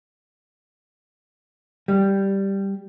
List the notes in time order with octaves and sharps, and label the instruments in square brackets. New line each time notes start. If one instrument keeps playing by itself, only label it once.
[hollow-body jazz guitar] G3